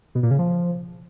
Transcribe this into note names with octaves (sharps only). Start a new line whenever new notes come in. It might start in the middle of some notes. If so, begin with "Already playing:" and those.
B2
A#2
C#3
F3